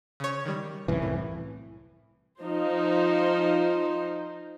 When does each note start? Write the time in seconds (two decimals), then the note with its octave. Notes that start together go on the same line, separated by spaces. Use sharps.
0.20 C#3 C#5
0.45 D#3 G3
0.88 C2 F#2 E3
1.02 A2
2.42 F3 D#4 C5